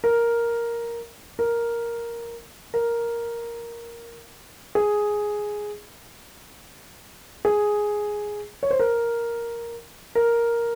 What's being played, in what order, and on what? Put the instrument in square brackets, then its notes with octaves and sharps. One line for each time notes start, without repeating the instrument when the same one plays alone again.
[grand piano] A#4
A#4
A#4
G#4
G#4
C#5
C5
A#4
A#4